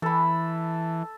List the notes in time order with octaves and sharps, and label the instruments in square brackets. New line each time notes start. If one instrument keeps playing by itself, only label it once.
[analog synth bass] E3 [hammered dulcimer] A4 B5